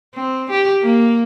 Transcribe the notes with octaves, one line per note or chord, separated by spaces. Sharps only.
C4
G4
A#3